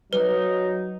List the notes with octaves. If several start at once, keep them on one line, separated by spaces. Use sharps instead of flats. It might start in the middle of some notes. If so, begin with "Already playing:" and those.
F#3 D#4 B4